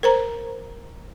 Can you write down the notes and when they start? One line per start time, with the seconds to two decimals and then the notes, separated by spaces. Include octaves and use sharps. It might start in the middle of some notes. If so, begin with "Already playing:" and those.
0.03 A#4 C5 A#5